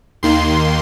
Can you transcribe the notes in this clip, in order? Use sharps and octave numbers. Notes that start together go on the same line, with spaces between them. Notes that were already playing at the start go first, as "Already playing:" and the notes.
D#2 D#3 A#3 C6